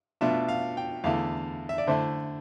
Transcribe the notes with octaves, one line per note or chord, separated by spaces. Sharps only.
B2 A3 D4 F4 E5
F5
G5
E2 D3 A3 E4 F5
E5
D5
D3 A3 E4 C5